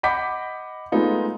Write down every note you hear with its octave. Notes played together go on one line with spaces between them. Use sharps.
D#5 F#5 B5 D6 G6 B6
G#3 A3 B3 D#4 F4